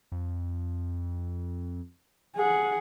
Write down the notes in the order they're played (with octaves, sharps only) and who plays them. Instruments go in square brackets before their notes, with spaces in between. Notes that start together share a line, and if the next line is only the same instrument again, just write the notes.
[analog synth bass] F2
[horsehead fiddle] G#4 F#5